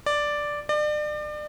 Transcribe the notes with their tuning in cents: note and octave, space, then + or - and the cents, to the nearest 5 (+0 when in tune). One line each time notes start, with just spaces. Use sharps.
D5 +0
D5 +35